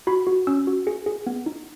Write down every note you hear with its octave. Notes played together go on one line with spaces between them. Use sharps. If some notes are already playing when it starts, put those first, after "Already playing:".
F#4 B5
F#4
C#4 E6
F#4
G#4
G#4
B3
D#4